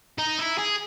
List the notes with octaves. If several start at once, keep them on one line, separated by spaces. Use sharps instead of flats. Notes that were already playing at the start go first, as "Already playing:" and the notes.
D#4
E4
G#4